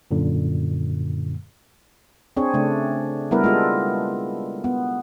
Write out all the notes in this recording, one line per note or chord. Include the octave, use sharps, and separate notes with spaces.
F#2 A#2 D3
C4 D4 G#4 C#5
C#3 A3 D4
G3 B3 E4 A#4 B4
G#3 F4 A4
B3